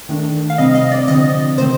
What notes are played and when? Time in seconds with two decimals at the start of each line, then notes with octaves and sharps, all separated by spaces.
0.09 D#3 A3 D4
0.50 F5
0.58 C3 G3 C4 D#5
0.75 D#5
0.92 D5
1.08 D3 F3 C4 D#5
1.58 C3 D#3 A3 C4 C5